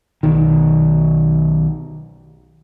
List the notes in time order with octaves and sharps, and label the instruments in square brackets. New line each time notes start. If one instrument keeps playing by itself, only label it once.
[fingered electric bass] B1 D#3